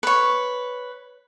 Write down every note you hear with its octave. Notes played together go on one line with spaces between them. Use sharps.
B4 C#5